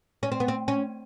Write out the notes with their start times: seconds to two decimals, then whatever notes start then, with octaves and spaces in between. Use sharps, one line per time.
0.23 C#4
0.32 C4
0.40 B3
0.48 C4
0.68 C#4